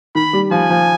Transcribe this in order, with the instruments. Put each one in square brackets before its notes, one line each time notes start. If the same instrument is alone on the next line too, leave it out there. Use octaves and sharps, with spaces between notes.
[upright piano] D#3 [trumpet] B5
[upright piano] G3
[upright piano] F3 [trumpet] G#5
[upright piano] F3